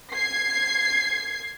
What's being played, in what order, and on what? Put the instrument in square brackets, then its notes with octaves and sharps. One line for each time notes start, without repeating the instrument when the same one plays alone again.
[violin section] G#6 C7